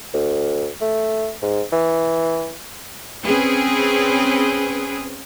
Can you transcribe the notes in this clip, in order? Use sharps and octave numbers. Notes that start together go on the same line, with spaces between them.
D2
A3
G#2
E3
C4 C#4 G#4 B4